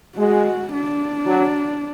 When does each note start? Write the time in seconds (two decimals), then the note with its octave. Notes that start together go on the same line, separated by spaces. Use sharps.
0.17 G#3 F#4
0.73 D4
1.27 F#3